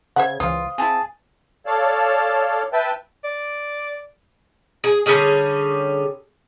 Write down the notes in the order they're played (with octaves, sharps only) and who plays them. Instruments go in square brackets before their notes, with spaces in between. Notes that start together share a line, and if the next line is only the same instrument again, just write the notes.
[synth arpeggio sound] C#3 G#6 [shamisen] C5 E5 F#5
[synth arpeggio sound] C#2 E3 [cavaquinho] F4 [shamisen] C5 [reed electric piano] F5 D#6
[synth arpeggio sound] C4 E4 [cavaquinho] G#4 A5
[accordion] A4 C#5 D5 F5 A5
B4 E5 G5 A5
[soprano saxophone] D5
[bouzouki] G#4
D3 G3 C#4 G#4